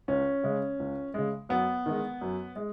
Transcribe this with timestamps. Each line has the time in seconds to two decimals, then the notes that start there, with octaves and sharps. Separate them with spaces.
0.08 C#2 C#4
0.43 C#3 G#3
0.80 C#2
1.14 C#3 G#3
1.49 F#2 B3
1.86 D#3 G#3
2.21 F#2
2.56 G#3